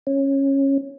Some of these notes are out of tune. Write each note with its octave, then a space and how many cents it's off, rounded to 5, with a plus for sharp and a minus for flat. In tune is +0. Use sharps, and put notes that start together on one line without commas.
C#4 -15